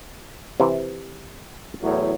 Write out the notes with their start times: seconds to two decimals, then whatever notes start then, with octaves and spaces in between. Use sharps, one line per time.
0.60 C3 E3
1.82 E2 A2 F#3